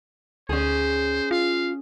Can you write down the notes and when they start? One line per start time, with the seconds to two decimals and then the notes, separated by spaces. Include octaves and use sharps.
0.49 D2 C#4 G#4 C5
1.31 F4 F5